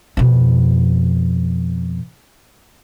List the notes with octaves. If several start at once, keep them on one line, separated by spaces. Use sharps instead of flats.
F2 B2